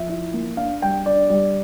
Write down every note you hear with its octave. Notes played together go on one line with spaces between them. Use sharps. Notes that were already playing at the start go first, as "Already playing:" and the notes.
Already playing: F3 E5
E4
A#3
D4 F5
G3 G5
D4 D5
G3